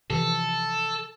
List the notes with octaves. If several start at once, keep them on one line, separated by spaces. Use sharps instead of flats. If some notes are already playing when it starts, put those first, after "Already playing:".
C3 E3 F3 A4